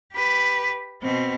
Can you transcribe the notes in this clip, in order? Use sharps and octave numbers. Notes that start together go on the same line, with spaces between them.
G4 B4
B2 C4